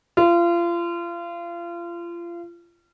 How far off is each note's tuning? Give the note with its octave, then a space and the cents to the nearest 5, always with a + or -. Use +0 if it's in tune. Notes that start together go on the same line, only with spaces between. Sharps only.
F4 -30